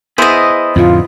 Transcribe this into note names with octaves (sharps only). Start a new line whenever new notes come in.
B3 E4 G#4 C5 D#5
F2 A2 D3 F4